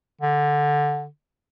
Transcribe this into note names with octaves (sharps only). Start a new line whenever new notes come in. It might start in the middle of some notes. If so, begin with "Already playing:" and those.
D3